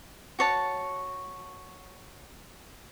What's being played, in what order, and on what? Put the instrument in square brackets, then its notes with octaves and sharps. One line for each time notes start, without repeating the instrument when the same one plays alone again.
[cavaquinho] F#4 C#5 A5